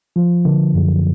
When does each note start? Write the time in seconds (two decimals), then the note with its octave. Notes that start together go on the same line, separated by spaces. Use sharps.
0.16 F3
0.45 D3
0.74 F#2